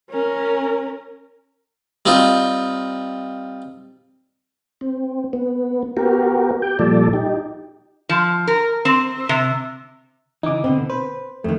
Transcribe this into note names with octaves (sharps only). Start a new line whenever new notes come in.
C#4 A#4
G3 C4 D#4 F4
C4
B3
B3 F#4 G4 A#4
G4 G5
A#2 F3 G3 A4 D5
D#4 G4
F3
A#4
C4
C3
C#3 E3 D#4 D6
B2 D3 C4
B4 C5
F2 D#3 A3